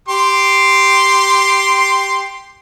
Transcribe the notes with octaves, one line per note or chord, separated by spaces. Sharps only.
G4 C6